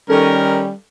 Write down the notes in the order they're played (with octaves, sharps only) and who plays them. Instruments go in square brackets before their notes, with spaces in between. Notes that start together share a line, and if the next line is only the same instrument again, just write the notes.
[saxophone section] D#3 C#4 [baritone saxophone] G3 [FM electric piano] A4 [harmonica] A#4